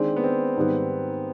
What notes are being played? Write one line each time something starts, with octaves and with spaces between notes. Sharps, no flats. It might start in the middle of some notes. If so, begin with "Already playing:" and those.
Already playing: D#3 G#3 C4 D4
B3
C4
G#2 D#3 G3 B3